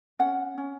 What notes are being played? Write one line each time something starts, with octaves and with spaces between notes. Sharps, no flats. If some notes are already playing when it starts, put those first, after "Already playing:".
C#4 F#5
C#4